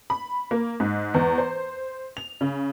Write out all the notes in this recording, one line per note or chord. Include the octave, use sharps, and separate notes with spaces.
B5
A#3
G#2
E2
C5
F7
C#3